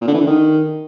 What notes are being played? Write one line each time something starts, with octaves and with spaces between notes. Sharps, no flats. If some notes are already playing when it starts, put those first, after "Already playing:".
A#2
D3
E3
D3
D#3